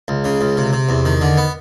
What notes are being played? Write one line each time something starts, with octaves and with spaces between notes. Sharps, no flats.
C#2
C#3
C#2
C3
C3
E2
D#3
D3
B3